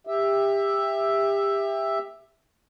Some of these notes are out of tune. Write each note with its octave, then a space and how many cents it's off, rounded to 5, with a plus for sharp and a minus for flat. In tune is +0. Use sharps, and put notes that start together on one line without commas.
G4 +25 E5 +0